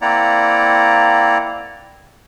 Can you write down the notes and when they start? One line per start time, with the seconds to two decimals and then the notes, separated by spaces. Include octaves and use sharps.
0.02 A#3 C4 E4 D5 F#5 A#5